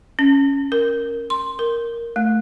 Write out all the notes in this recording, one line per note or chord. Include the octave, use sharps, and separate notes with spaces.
C#4
A#4
C6
A#4
A3